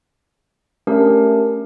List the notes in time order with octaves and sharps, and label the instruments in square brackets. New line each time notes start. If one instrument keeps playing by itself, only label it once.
[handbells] A3 C#4 D4 G4 A#4